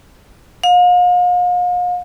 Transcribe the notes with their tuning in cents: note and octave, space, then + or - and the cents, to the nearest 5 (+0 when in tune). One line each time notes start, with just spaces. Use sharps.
F5 +40